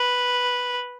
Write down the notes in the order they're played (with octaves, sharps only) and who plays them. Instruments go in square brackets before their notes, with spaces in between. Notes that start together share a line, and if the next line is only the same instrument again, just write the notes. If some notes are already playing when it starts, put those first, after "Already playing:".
Already playing: [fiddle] B4